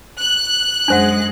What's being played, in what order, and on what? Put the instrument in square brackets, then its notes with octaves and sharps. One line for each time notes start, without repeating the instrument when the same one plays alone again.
[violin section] F#6
[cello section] F#2 G#3 G#4 [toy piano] D4 C5 F#5